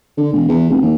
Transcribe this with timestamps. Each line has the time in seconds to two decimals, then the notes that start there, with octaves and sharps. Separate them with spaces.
0.17 D3
0.33 E1
0.48 E2
0.69 F1
0.81 D#2